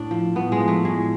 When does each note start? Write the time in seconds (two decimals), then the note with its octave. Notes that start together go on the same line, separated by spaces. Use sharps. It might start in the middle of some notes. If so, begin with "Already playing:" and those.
Already playing: A2 D4
0.11 F3
0.36 A2 B3
0.52 G#3
0.60 F3
0.68 A3
0.85 A2 G#3